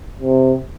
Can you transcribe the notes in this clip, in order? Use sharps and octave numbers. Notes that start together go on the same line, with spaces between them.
C3